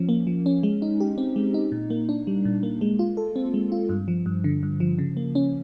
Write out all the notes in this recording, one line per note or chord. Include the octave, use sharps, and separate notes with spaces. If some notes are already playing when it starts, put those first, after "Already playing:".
Already playing: F3 C#4
A#3
F3
C#4
G#3
D#4
G4
C4
G#3
D#4
A#2
A#3
D4
G3
A#2
A#3
G#3
F4
A4
C4
G#3
F4
G2
F3
G2
D3
G2
F3
C#3
A#3
C#4